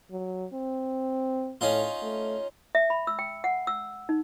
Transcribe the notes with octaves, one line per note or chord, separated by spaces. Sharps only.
F#3
C4
A2 C#4 D#4 F4
A3
E5
B5
E6
G5
F#5
E6
D#4